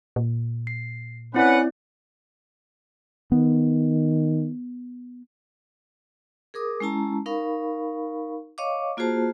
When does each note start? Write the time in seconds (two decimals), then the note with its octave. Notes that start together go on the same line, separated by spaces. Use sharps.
0.16 A#2
0.67 C7
1.34 C4 C#4 E4 B4 D5 F#5
3.32 D#3 B3
6.54 G#4 A#4 D6 D#6
6.80 G#3 C#4 E4 A5 A#5
7.26 D#4 A#4 F5 B5 C#6
8.58 C#5 D#5 F5 C#6 D6
8.97 A#3 F4 F#4 G#4 C5 A5